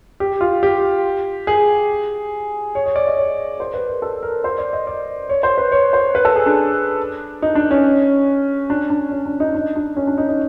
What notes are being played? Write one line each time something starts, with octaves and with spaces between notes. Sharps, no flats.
G4
F4
G4
G#4
C#5
C#5
D5
D#5
C#5
C5
B4
A#4
A4
A#4
C5
D5
D#5
D5
C#5
C5
B4
C#5
C5
B4
A4
G#4
D4
D#4
D4
C#4
D4
D4
C#4
D4
D#4
D4
D4
C#4
D4
D#4
D#4